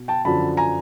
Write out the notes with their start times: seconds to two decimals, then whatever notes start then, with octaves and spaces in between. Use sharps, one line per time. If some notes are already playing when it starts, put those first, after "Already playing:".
Already playing: B2
0.08 G5 A5
0.25 F#2 D3 F3 A5 B5
0.57 G#5 A#5